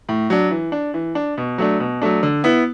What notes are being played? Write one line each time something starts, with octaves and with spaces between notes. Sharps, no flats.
A2
F#3 D4
E3
D4
E3
D4
B2
F#3 A3 D4
B2
F#3 A3 D4
D3
B3 E4